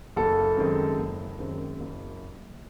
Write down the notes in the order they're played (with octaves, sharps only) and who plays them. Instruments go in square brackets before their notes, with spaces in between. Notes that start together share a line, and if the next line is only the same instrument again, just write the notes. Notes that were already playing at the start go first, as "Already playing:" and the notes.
[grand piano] F#1 [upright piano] A4
[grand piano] F#2 D#3 G#3 C4
F#1
F#2 D#3 G#3 C4
F#1